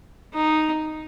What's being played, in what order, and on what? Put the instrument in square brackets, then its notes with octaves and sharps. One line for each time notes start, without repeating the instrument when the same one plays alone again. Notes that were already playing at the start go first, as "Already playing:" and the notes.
[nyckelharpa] D#4